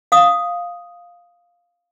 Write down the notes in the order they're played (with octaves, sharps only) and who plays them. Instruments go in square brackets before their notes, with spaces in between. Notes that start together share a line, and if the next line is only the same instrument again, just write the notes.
[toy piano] F5 D#6